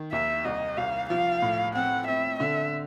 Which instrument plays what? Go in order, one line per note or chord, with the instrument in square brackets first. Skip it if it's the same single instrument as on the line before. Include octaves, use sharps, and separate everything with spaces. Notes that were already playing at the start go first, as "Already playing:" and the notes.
Already playing: [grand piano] D#3
[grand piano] D#2 [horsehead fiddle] E5
[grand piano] C2 [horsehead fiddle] D#5
[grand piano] C2 [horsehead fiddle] F5
[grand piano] F3 [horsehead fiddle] F5
[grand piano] A2
[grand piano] C4 [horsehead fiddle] F#5
[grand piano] C4 [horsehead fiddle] E5
[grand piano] D3 [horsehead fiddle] E5